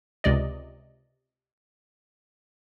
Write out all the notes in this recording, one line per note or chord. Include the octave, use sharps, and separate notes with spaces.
C#2 C3 D5 D#5